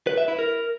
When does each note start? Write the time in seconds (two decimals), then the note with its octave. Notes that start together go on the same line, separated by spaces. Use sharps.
0.07 B4
0.18 E5
0.28 E4
0.39 A#4